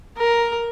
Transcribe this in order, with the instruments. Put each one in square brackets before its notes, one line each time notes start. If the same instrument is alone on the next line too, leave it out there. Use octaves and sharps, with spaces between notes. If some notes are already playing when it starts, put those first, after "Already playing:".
[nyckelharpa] A#4